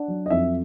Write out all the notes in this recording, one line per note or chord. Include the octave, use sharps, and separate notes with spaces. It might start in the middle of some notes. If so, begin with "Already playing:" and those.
Already playing: D4 F#5
F#3
D#5
F2 E5